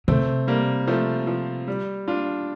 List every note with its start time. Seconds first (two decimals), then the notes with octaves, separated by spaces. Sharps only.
0.08 C3 A3 C4
0.47 G3 A#3
0.87 F3 A3
1.27 F3
1.67 G3
2.08 D4 F4